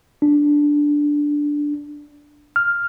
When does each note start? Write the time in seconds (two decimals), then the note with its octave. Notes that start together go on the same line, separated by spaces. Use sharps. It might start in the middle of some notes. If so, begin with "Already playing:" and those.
0.22 D4
2.56 F6